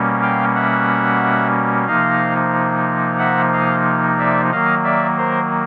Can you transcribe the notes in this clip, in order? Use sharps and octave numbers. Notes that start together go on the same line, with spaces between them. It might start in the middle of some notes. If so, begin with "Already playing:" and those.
Already playing: B2 G3 A#3 C#4
F5 G5
E5 F#5
C3 F3 A#3 D#4 D#5 F5
E5 F#5
D#5 F5
D5 E5
D#3 F#3 A#3 D#5 F5
D5 E5
A#4 C5